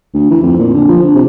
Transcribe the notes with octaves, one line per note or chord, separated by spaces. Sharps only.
D2
E3
F2
A#2
D3
F3
D3
C3